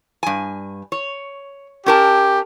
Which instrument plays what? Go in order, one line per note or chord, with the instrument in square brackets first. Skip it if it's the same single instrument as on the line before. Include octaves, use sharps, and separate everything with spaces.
[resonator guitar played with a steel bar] G2 G#5
C#5
[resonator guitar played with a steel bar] C#4 A#4 A5 [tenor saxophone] G4